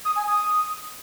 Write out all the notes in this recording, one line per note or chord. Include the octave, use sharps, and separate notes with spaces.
D#6
G#5
D#6